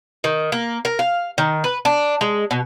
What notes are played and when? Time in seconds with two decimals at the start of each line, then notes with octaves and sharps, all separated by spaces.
0.24 D#3
0.52 A#3
0.85 A#4
0.99 F5
1.38 D#3
1.64 B4
1.85 D4
2.21 G#3
2.51 B2